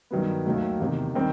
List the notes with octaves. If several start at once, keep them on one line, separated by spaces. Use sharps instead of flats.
G2 D#3 F#3 B3
D#2 D#3 F#3 A3
E2 C3 D#3
D#3 G3 C4